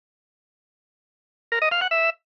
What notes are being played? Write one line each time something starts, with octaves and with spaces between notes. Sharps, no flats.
A#4
D#5
F5
F#5
E5